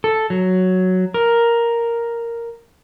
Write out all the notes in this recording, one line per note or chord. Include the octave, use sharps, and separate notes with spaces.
A4
F#3
A#4